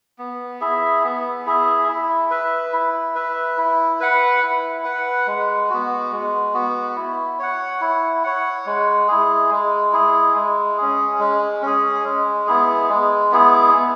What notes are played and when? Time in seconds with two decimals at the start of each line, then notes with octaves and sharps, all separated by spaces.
0.18 B3
0.61 E4 G#4 E5
1.04 B3
1.46 E4 G#4 E5
1.89 E4
2.31 B4 E5
2.73 E4
3.15 B4 E5
3.58 E4
4.00 B4 F#5
4.42 E4
4.85 B4 F#5
5.27 G#3
5.70 B3 F#4
6.12 G#3
6.54 B3 F#4
6.96 E4
7.39 C#5 F#5
7.81 E4
8.24 C#5 F#5
8.66 G#3
9.08 E4 G#4
9.51 G#3
9.93 E4 G#4
10.35 G#3
10.78 C#4 G#4
11.20 G#3
11.62 C#4 G#4
12.05 G#3
12.47 B3 E4 G#4
12.90 G#3
13.32 B3 E4 G#4
13.74 B3